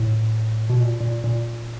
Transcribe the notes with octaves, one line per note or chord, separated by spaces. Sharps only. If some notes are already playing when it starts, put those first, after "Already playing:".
Already playing: A2
B2
A#2
A#2
A#2